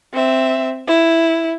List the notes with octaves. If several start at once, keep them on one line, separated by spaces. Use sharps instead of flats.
C4 E5
E4